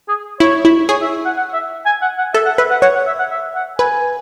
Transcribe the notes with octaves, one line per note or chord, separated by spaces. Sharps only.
G#4
E4 C#5
E4
G#4 C#5
E5
F#5
F#5
E5
G#5
F#5
F#5
A4 E5
F#5
B4 E5
F#5
C#5 F#5
F#5
E5
F#5
E5
F#5
B4 G#5